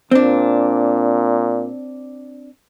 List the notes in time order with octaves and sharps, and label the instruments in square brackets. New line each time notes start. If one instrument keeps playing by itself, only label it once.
[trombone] A#2 [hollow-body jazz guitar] C4 D4